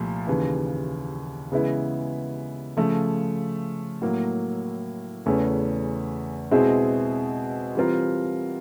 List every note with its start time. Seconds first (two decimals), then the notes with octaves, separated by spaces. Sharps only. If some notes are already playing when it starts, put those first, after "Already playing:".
Already playing: C2 A#2 F3 A3
0.27 D#2 C#3 E3
1.52 C#3 E3 G#3 B3 E4
2.77 C#3 F3 A3
4.02 A2 F#3 A#3
5.26 E2 C#3 E3 A3 C#4
6.51 B2 G#3 C4 E4 G#4
7.75 E3 G3 C4 F4 A#4